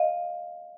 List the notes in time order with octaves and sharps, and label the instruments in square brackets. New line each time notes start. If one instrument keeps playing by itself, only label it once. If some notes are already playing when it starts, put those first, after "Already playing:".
Already playing: [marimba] D#5 F5